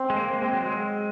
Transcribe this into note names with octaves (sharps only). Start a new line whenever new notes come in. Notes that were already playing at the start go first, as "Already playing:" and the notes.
Already playing: C4
G#3
A#3
G#3 C4
F#3
G#3